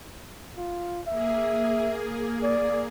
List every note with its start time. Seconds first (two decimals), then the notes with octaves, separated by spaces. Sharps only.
0.58 F4
1.08 A#3 G#4 E5
2.43 D5